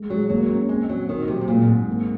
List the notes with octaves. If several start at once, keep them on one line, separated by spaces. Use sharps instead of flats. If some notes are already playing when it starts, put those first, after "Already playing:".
Already playing: G#3
F#3 G#3
F#3 A#3
C#4
G#3 C4
F#3 C4
D#3 F#4
C3 F#3
C3
A#2 G#3
G#2 C4
A#3